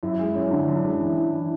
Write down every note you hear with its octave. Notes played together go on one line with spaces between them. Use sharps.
F#2 E4
G#3
F#2 C#4
D3 D4
F#2
D4
G#3
E3
E4
E3